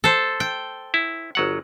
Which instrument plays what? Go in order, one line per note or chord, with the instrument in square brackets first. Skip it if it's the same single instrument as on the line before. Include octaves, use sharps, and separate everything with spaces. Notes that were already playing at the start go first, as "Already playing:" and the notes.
[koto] A4 C5
G5
[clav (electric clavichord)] E4
G1 F#3 F#5